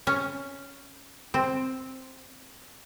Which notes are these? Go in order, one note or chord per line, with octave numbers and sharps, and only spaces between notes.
C#4
C4